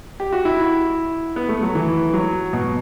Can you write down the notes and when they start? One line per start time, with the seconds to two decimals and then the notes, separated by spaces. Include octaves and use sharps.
0.20 G4
0.33 F#4
0.45 E4
1.36 B3
1.49 A3
1.63 F#3
1.75 E3
2.14 F#3
2.53 B2